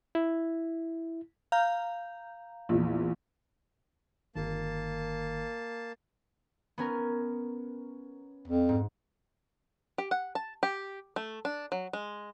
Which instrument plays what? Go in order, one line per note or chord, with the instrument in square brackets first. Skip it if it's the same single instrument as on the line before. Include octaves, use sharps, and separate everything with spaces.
[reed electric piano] E4
[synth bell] F5 A#5 G6
[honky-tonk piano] A#1 E2
[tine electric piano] G1 D#3 [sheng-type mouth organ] A#3 A5
[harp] B3 C#4 A#4
[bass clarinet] F2
[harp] G#2
[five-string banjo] G4
F#5
A5
G4
A3
D4
F#3
G#3